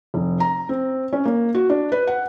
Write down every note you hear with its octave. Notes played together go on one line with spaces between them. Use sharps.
F1
A#5
C4
C#4
A#3
F#4
D4
B4
F#5